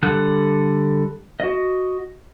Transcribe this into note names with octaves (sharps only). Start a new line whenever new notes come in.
D3 G3 A4 F#5 F#6
F#4 D#5